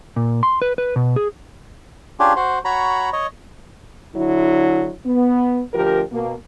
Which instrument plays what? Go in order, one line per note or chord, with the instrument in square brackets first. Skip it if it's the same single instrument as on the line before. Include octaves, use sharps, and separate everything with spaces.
[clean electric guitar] A#2
C6
B4
B4
B2
G#4
[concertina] C#4 D4 F4 G4 G#4
F#4 C5
F#4 C#5 A#5 B5
C#5 D#5
[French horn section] D3 F#3 E4
B3
D2 F3 G4 A#4
B2 A#3